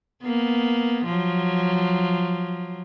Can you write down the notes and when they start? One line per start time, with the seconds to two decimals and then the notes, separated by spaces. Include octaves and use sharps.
0.23 A#3 B3
1.05 F3 F#3